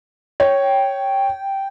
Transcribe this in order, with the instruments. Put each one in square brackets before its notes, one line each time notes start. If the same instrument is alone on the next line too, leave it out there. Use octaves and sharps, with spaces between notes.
[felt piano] C#5 [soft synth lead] G5